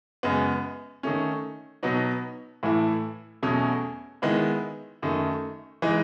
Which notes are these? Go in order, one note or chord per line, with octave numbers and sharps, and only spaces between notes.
F#2 C#3 G#3 B3
D#3 A3 C#4
B2 F#3 B3 D#4
A2 E3 A3 E4
E2 B2 F#3 A3 C#4
D#3 G#3 B3 E4
F#2 D#3 A3
E3 G#3 D#4